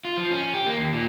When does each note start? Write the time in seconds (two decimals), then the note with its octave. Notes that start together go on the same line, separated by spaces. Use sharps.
0.05 F4
0.18 F3
0.31 C#4
0.53 G4
0.67 A#3
0.78 D#2
0.93 A#2